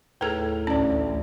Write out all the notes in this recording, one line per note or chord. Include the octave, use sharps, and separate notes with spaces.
D#2 A2 G#4 A4 B4 A#5 G#6
A1 D2 C#4 D5 A#5